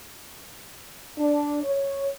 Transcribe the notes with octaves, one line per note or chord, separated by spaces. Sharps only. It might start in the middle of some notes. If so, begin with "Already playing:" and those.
D4
C#5